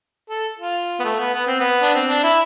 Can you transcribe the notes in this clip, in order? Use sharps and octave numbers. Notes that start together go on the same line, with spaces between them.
A4
F4
B3
A3
B3
B3
C4
B3
D4
C4
D4
E4